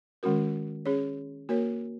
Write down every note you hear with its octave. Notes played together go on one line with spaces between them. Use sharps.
D#3 G#3 C#4 F#4 A#4
C#4 G#4 C#5
A#3 F#4 A#4 C#5